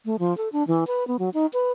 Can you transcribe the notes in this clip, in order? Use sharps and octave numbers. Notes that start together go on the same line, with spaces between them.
A3
F3
A4
D4
E3
B4
B3
F#3
D#4
B4